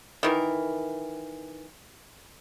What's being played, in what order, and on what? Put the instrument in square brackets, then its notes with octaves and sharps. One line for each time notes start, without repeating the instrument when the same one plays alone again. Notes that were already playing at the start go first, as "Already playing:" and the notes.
[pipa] D#3 E3 A#4